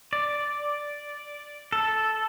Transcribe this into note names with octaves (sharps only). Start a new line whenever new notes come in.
D5
A4